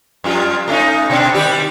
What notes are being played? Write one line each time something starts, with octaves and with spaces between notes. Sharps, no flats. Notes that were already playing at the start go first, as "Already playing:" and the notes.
F2 G3 F4
A3 C#4 D#4
B2 C4 D4
D#3 G3 G4